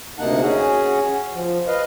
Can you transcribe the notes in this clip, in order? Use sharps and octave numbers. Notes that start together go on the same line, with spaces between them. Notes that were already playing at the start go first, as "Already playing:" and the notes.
D2 C3 A#3 D#4 F#5 A5
C#4 F#4 G#4
F3
B4 D#5 F5